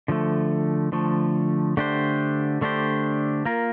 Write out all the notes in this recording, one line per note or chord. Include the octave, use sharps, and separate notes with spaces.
D3 F3 A3
D3 F3 A3
D3 A3 D4 G4 C5
D3 A3 D4 G4 C5
A#3 F4 A#4